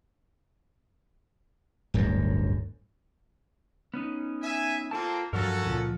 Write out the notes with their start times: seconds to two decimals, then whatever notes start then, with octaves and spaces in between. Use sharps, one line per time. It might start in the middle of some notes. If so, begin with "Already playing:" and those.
1.94 D1 G1 F#2
3.94 B3 C#4 D#4
4.42 E5 G#5
4.91 A#3 C4 F4 A4 A5
5.33 G2 F3 F#3 C#4 F#4 A4 A#4
5.66 C#2 A#2 F3